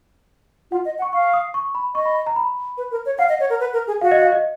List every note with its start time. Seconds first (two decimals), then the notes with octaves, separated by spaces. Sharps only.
0.71 F4 F#5
0.85 D#5
0.98 F#5
1.02 C#6
1.13 F5 C#6
1.33 D#6
1.54 C#6
1.75 B5
1.95 D#5 C#6
2.05 B5
2.27 A#5
2.36 B5
2.78 B4
2.91 A#4
3.06 C#5
3.18 F5 F#5
3.29 D#5
3.40 C#5
3.50 A#4
3.60 B4
3.73 A#4
3.87 G#4
4.01 F#4 F5
4.11 D#5
4.22 F5
4.32 D#5